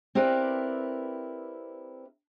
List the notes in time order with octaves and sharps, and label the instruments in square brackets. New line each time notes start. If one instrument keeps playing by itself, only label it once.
[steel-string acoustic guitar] C4 E4 G4 A#4 B4 D5